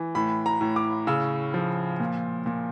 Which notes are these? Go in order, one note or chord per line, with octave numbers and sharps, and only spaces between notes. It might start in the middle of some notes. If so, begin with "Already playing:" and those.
Already playing: E3
A2 B5
A#5
A2
D6
C#3 E6
F3
A#2
A#2